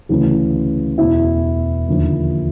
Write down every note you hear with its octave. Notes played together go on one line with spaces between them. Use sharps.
D2 C#3 E3
E2 B2 E4
D#2 D3 F3